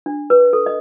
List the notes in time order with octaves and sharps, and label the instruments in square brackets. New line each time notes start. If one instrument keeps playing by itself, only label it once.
[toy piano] D4
B4
A4
D#5